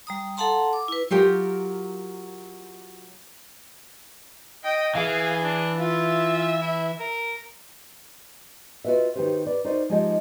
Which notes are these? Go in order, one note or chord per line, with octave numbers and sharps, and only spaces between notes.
G3 A#5 D#6
A4 F5 F#5 A5 A#5 C6
D6
E4 B4
F#3 F4 G4 A#4
D#5 G5
E3 G#4 F5
D4
F4 E5
E4
A#4
F4 F#4 A#4 B4 D#5 E5
D#3 D#4 F#4 G4 B4 C5
B4 D5
D#4 F#4 A#4 C5 D5 D#5
F3 G#3 D#4 F4 G4 D#5